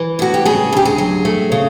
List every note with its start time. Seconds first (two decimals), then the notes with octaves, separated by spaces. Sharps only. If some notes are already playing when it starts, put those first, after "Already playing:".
Already playing: E3
0.19 A2 F#4
0.34 G4
0.45 C#3 G#4
0.73 D2 G4
0.85 G#4
0.98 F#3
1.25 A3
1.52 C#3